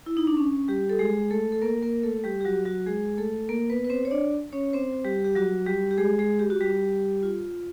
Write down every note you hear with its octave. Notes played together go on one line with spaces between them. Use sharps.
E4
D#4
D4
C#4
G3 G4
A4
G#3 G#4
A3 A4
A4
A#3 A#4
A#3 A#4
A3 A4
G3 G4
G4
F#3 F#4
F#3 F#4
G#3 G#4
A3 A4
A#3 A#4
B3 B4
B4
C4 C5
C#5
D4 D5
C#4 C#5
C4 C5
G3 G4
G4
F#3 F#4
G3 G4
G4
G#3 G#4
G#3 G#4
G4
F#4
G3 G4
F4